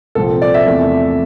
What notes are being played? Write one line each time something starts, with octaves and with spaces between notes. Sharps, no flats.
C2 A#2 F3 C4 A4
D5
E5
E2 C3 F3 A3